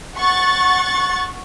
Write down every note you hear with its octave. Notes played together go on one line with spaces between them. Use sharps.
F#5 C#6 A6